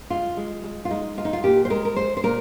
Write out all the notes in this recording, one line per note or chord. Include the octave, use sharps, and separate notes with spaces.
G#3 F4
G#3
G#3
F4
G#3 D#4
G#3 F4
D#4
F4
A#2 G4
C5
G#3 A#4
A#4
G#3 C5
C5
A#2 A#4